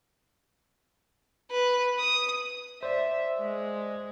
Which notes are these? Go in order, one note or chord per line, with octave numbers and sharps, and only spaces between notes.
B4
D#6
C5 D5 E5
G#3